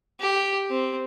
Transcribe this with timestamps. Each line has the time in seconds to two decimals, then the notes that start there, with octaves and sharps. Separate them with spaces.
0.20 G4
0.70 C4